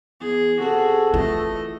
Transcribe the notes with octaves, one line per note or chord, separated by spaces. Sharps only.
E2 G#4
C3 F#4 G#4 A4
E3 A3 F4 D#5